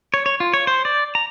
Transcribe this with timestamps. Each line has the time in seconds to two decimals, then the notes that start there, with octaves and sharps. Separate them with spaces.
0.14 C#5
0.26 C#5
0.40 F4
0.54 C#5
0.67 C5
0.85 D5
1.15 A#5